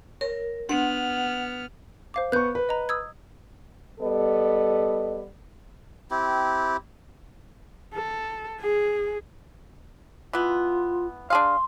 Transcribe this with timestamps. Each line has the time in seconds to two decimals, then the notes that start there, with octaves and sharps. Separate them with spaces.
0.21 A#4 C#5
0.69 B3 D4 F#5 F6
2.14 C5 F5 D6
2.32 B3 C#6 F#6 G6
2.55 B4
2.69 D#5 A#5
2.89 D#6 E6 G#6
4.01 G3 B3 A4 D#5
6.11 C4 E4 G4
7.95 A4
8.61 G#4
10.33 E3 B3 F4
11.30 D4 G#4 F5 C6